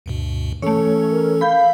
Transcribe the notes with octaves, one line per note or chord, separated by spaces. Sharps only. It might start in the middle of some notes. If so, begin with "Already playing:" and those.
D2 G2 B2
E3 A3 C#4 A4 C#5
A#4
F5 B5 G6